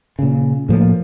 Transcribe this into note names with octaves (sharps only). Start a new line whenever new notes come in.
A#2 C#3
A2 F3 A#3